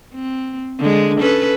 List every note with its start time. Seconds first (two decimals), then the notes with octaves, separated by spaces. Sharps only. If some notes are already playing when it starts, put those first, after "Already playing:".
0.14 C4
0.79 D3 G#3
1.20 C#4 A4 B4